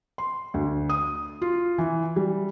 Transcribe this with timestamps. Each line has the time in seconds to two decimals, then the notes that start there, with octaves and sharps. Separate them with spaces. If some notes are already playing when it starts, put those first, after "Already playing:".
0.18 C6
0.54 D2
0.90 D#6
1.42 F4
1.78 E3
2.16 G3